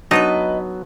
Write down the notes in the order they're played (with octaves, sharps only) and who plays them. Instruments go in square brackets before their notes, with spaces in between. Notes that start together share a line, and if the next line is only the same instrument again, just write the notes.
[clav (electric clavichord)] F#3 B3 [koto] D4 D#4 [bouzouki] B4 C5 D#5